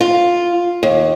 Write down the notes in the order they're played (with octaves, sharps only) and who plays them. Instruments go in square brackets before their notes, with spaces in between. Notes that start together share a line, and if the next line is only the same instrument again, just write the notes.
[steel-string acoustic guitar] F4
D#2